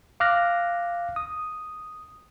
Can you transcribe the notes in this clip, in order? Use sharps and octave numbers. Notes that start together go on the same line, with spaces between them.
F5 D6 F6 F#6 A#6
D#6